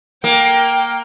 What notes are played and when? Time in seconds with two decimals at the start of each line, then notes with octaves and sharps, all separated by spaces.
0.24 A#3 G5